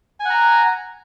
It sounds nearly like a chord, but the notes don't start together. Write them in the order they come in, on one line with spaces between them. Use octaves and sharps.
G#5 F#5 A#5